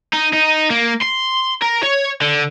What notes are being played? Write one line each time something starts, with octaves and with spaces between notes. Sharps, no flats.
D#4
D#4
A#3
C6
A#4
C#5
D3